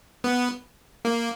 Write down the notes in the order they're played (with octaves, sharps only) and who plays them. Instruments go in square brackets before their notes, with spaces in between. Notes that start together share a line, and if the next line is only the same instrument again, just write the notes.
[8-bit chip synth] B3
A#3